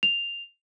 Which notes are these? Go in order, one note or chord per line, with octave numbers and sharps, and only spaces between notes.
F7